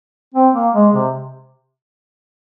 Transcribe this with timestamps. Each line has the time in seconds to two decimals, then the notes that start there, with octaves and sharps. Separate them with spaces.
0.35 C4
0.54 A#3
0.74 G#3
0.93 C3